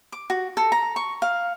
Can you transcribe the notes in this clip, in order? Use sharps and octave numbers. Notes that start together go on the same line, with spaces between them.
D6
F#4
A4
A#5
C#6
F5